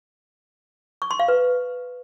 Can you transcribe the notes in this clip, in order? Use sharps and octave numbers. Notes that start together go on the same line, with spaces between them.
C#6
C6
F5
B4